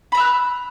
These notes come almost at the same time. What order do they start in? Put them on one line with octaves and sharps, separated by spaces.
B5 A#5 E6 F#6